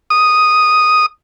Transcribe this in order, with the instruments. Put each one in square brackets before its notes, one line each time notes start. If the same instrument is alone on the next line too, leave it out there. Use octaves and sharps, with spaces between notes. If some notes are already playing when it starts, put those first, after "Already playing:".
[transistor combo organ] D#6